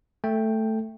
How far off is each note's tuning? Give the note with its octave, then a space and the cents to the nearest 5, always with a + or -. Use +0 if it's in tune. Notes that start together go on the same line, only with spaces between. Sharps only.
A3 +0 A4 +0 G5 +5